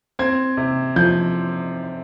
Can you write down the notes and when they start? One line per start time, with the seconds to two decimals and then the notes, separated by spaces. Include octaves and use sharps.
0.19 C4 G#6
0.57 C3
0.96 F3 G6